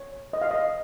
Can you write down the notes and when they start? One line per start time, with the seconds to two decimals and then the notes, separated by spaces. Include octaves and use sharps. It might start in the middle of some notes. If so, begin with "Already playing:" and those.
Already playing: C#5
0.33 D#5
0.42 F5
0.51 D#5